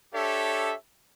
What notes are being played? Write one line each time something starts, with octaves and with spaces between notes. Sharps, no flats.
D4 G4 A4 C#5 E5